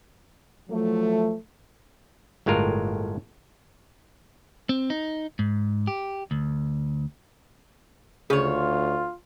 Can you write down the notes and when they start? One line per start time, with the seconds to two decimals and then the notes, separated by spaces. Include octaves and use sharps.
0.69 F3 F#3 A3
2.46 G1 A2 G#3 F4 A#4
4.69 C4
4.90 D#4
5.39 G#2
5.87 G4
6.31 D2
8.30 D2 C#3 F4 G#4 C#5